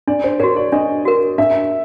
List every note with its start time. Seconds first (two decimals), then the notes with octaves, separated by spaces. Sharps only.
0.08 D4 D5
0.24 C5
0.40 F#4 A#4 C#5
0.56 D5
0.72 D4 D#5
1.05 F#4 A#4
1.38 D4 E5